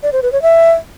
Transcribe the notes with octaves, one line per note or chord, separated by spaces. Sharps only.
D5
C5
B4
C#5
E5